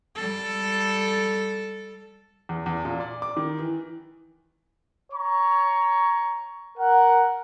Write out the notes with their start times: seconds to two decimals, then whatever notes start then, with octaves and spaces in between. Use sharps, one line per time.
0.16 G3 A4
2.49 E2
2.66 E2
2.85 A#2
3.00 D5
3.22 D6
3.37 D#3
3.59 E3
5.13 C#5 A#5 C#6
6.78 A#4 F#5